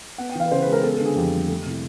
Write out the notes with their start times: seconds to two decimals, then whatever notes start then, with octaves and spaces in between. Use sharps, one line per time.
0.18 B3 F#5
0.29 G5
0.35 E3 F5
0.46 B4
0.51 C#3 C5
0.62 G#3 B4
0.73 A#4
0.83 B3 A4
0.94 A4
1.00 D3
1.06 G#4
1.16 F2 G4
1.33 G3
1.48 A3
1.66 C3 E4